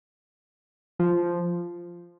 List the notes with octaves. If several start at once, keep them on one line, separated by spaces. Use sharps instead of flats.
F3